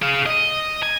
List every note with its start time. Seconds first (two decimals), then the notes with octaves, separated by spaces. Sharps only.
0.02 G#4 F5
0.26 D#5
0.83 G#5